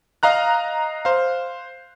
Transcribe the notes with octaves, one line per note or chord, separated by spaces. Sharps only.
D#5 F5 A#5 F#6
C5 F5